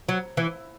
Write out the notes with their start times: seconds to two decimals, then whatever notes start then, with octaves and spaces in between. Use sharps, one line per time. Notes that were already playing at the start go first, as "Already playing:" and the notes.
0.09 F#3
0.37 E3